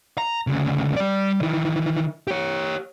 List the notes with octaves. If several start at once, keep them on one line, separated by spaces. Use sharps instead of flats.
A#5
D2 C#3
G3 D5
D#3 E3
G4 C#5